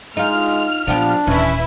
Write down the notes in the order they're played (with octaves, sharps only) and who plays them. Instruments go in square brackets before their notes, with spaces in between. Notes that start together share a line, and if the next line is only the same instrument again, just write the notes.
[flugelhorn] G#3 [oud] D#4 F4 [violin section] F6
[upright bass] A#2 [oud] F3 B3 G4 [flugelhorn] D4
[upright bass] D#1 [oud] E3 C#4 [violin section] E4 B4 E5